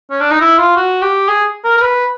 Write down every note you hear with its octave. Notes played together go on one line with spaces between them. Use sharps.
C#4
D4
D#4
E4
F4
F#4
G4
G#4
A#4
A#4
B4